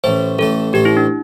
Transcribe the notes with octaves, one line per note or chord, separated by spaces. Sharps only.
A1 A2 A3 C5
A1 A2 A3 A4
A1 A2 A3 G4
E4
D4